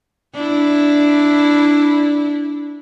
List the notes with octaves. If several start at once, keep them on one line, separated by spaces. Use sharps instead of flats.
D4 E4